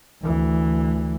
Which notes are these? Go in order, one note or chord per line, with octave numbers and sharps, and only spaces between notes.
D2 E3